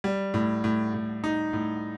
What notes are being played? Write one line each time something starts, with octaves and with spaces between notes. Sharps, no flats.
G3
A2
A2
A2
D#4
A2